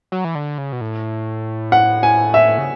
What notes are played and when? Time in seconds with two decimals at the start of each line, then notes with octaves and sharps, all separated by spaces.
0.12 F#3
0.24 E3
0.35 D3
0.58 C#3
0.72 B2
0.81 A2
1.72 F#5
2.03 G#5
2.34 E5
2.58 C#3